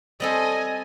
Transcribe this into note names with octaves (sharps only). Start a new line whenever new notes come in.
G3 C4 A4 D#5 G#5